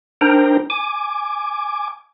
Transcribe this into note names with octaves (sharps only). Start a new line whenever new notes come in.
D4 D#4 A#4 C5 G5 A#5
G#5 D6